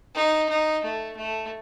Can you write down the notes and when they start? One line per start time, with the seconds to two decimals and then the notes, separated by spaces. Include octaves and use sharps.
0.15 D#4
0.49 D#4
0.84 A3
1.17 A3